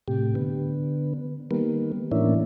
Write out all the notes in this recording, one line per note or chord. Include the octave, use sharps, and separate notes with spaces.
A2 C3 G4
D3 B3
D#3 G3 A#3 B3
A2 E3 A#3 C#4 D4 E4